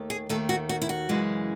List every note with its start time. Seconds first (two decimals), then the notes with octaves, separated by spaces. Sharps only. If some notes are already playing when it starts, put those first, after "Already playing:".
Already playing: D#2 D#3 A3
0.10 G#4
0.29 D#2 D#3 A3 A4
0.49 F#4
0.69 F#4
0.82 E4
0.89 F#4
1.09 F#2 C#3 E3 G#3